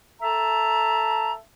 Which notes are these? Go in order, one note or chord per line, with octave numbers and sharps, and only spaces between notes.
A4 E5 A5 A#5